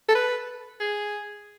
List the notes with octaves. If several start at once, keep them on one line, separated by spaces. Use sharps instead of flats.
A4
B4
G#4